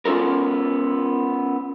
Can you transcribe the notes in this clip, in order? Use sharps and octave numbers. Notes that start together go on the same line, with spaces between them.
B3 C#4 F4 A4 A#4